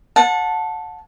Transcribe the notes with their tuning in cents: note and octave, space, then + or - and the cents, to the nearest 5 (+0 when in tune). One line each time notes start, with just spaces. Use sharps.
F#5 -30 A5 +0